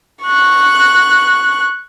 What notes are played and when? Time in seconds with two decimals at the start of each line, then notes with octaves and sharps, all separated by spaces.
0.23 C#6 F#6